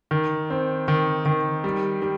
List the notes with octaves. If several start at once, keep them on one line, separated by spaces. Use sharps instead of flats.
D#3
C4
D#3
D#3
G3
G3